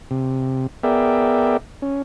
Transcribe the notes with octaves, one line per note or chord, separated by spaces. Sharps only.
C3
B3 G#4 A#4 D5 E5 G5
C#4